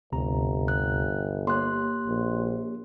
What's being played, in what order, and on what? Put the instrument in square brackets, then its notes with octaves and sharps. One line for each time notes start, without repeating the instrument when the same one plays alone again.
[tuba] G1 [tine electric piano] D2 C3 A#5
[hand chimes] F#6
[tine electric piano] A#3 G4 C#5 [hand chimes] C6 F#6
[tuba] A#1